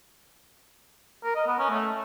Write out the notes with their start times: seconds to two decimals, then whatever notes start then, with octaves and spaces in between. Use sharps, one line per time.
1.24 A#4
1.36 D#5
1.47 B3
1.59 C#4
1.70 A3